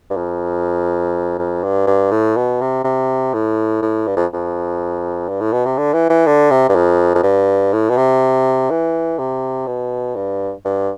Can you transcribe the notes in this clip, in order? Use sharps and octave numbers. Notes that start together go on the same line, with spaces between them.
G2
F2
F2
G2
G2
A2
B2
C3
C3
A2
A2
G2
F2
F2
G2
A2
B2
C3
D3
E3
E3
D3
C3
G2
F2
F2
G2
A2
B2
C3
E3
C3
B2
G2
G2